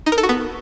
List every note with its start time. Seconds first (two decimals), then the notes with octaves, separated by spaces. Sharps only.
0.06 D#4
0.12 A#4
0.18 A4
0.23 F#4
0.29 B3